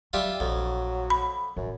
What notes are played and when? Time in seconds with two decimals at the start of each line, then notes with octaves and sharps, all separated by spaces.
0.13 F#3 G3 F4 G4 E5
0.40 A#1 F2 F#3
1.10 B5
1.56 A1 F#2